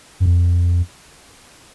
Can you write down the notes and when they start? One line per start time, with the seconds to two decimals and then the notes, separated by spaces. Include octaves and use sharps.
0.20 F#2
0.26 F2